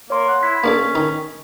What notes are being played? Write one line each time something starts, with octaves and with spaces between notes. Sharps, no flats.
A#3 C#5 C6
F#5
E4 G#6 B6
A#3 C#4 D4 A4 B6
D#3 D#4